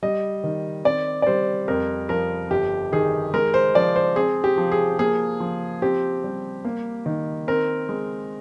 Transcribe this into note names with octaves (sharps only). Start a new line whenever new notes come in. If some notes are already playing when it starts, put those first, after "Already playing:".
G3 D#5
D#3
C4 D5
D5
G3 C5
F2 A#4
F3 A#4
G1 G4
D#3 G#4
G#3 A#4
C5
F3 D5
C5
C4 G#4
G4
F3
G#4
A#3 G#4
F3
C4 G4
G3
A#3
D#3
C4 A#4
G#3